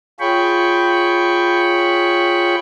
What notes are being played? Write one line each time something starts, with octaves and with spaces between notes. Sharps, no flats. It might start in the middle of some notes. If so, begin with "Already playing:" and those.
F4 G#4 C#5 G5 B5 C#6